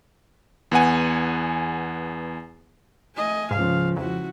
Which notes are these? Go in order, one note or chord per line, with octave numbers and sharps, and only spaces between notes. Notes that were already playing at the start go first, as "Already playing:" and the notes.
E2 B3 F#5 G#5
A3 D#5 G#5
C#2 G#2 C#3 F3 F5
F2 E4 F#4